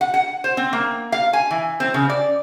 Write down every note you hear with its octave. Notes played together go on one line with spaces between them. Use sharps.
F#5
F#5
C5
C4
A#3
F5
G#5
E3
C4
C#3
D5